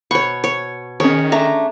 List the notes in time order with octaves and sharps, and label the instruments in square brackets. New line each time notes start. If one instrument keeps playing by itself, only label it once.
[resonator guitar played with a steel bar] B2 [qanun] C#5 C#6
[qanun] C#5
[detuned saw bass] D#3 [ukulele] C#4 G#4 [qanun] C#5
[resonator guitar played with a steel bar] A3 D4 [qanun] A#5